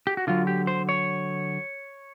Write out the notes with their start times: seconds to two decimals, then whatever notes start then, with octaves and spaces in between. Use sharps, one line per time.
0.07 G4
0.17 F#4
0.27 D3 F#3 F4
0.47 G4
0.67 C5
0.89 C#5